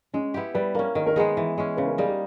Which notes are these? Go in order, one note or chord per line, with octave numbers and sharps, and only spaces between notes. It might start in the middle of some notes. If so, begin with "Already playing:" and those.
G#3 C#4
B3 E4 G4
G3 B4
A#3 C#4 A#4
D#3 A#4
A#4
G#3 B3 D#4 G#4
E3
G#3 C#4
C#3 B4
A#4
G3 A#3 D#4 G#4
G4